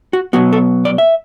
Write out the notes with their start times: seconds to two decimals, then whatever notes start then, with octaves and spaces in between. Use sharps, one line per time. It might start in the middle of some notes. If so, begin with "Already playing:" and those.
0.13 F#4
0.33 B2 F#3 B3 F#4
0.53 A4
0.85 D5
0.98 E5